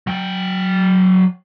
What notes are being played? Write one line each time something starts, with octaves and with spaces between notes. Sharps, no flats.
F#3 G5